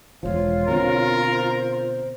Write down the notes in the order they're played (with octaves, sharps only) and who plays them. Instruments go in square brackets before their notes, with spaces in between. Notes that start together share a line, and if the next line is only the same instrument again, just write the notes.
[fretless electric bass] E1 C#2 F3 [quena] F4 [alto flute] C#5
[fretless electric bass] B2 D3 C4 [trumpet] A#4
[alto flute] C5